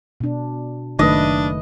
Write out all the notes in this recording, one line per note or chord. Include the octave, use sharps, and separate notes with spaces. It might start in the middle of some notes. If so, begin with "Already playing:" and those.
B2 D4
F#1 D#3 A3 D4 B4 D#5